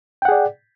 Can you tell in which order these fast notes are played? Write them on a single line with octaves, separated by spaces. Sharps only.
G5 F#5 G#4 D5